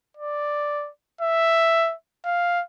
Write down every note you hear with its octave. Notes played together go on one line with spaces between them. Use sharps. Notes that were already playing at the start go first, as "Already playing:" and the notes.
D5
E5
F5